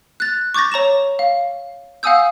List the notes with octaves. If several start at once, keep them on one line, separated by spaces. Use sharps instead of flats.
F#6 A6
C#6 D6 G6 A6 A#6
C#5 A#5 C#6 E7
F5
F5 F#5 G#5 D#6 E6 G6